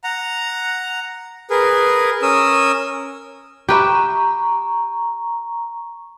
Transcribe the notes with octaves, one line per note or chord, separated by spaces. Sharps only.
F#5 A#5
G#4 A#4 B4
C#4 A#4 D#6 E6
G4 B4 E5 A#5 C#6